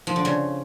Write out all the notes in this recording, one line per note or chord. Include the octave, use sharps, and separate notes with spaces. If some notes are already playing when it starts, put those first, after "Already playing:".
F3
D3
C#3